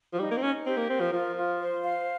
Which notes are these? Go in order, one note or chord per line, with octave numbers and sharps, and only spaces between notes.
F3
G3 D#4
A#3
C4
C#4 D#4
C4 G4
A#3
C4 A#4
F3
F3 F4
F4
C5
F5